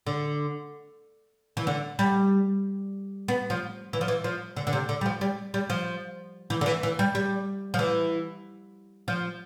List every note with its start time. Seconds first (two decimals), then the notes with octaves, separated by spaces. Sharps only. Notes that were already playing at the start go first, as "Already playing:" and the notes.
0.07 D3
1.57 E3
1.67 D3
1.99 G3
3.28 B3
3.50 F3
3.93 E3
4.01 F3
4.08 E3
4.24 F3
4.57 D3
4.67 D3
4.73 C3
4.89 D3
5.01 G3
5.06 F3
5.21 G3
5.54 G3
5.70 F3
6.50 E3
6.61 D3
6.66 E3
6.83 E3
6.99 G3
7.15 G3
7.74 F3
7.79 E3
9.08 F3